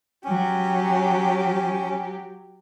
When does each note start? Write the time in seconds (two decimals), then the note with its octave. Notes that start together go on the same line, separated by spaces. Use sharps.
0.24 F#3 C#4 G4